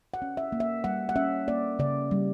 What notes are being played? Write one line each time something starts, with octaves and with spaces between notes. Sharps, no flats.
F#5
C#4
E5
A#3
E5
G3 F#5
F#5
C#4 E5
A#3 D5
C#3 D5
G3